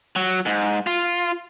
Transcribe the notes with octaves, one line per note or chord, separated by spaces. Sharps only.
F#3
G#2
F4